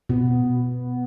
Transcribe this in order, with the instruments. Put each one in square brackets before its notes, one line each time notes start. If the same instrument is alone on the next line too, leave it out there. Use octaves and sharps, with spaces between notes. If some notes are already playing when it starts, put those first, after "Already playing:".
[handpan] B2 [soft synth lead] B3